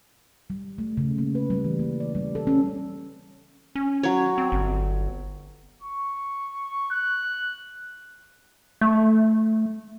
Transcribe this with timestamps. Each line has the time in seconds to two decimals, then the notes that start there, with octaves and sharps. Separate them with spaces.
0.50 G3
0.78 A3
0.97 C#3
1.18 A#3
1.35 B4
1.50 G3
1.64 E3
1.79 A#3
2.00 D5
2.15 G3
2.35 A4
2.47 C#4
3.75 C#4
4.03 F#3 C#5
4.38 C4
4.52 G1
5.82 C#6
6.91 F#6
8.81 A3